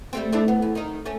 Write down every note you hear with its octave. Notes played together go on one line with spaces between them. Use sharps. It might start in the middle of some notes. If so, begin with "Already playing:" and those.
G3 A3 C4
A3 D4 E4
B3
E2
D#3 D#4
A3 C#4